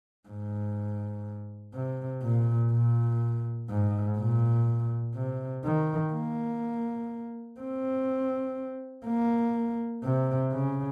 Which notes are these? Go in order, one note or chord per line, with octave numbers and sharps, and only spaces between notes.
G#2
C3
A#2
A#2
G#2
A#2
C3
D#3
A#3
C4
A#3
C3
C#3